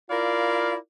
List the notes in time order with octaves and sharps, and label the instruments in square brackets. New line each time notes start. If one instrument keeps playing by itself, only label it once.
[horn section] E4 F4 A#4 D5 F5